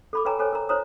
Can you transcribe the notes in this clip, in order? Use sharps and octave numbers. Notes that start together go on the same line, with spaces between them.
A4 B5 D6
A4 B4 C#5 G5 G#5 A#5
A4 C5 C#5 G#5
A#4 A#5
F4 C5 C#5 A#5 D#6